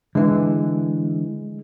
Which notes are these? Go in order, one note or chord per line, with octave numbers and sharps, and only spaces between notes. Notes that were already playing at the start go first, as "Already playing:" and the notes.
D3 E3 G#3